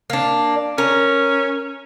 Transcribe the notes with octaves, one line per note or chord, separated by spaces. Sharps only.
A#3 D4
C#4 A#4